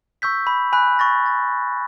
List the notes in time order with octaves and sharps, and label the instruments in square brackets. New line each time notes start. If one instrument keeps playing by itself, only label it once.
[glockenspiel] C#6 E6 G6 B6
B5
G#5 B5 F#6
C#6 A6 A#6
A6